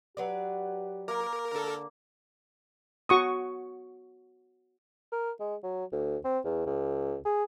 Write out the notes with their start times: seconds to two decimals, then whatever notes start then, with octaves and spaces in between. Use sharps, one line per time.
0.17 F#3 G4 B4 D5
1.08 A#3 A#4
1.52 D3 A4 A#4
3.09 F#4 C#6 D#6
5.12 A#4
5.40 G#3
5.63 F#3
5.92 D2
6.24 C4
6.44 E2
6.66 C#2
7.25 G#4